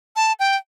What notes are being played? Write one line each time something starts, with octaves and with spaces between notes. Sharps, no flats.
A5
G5